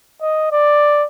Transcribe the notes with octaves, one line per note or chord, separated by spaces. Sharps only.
D#5
D5